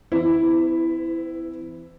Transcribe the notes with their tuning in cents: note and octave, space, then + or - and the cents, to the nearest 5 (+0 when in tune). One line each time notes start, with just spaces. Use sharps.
E3 +20 C4 -40 E4 +0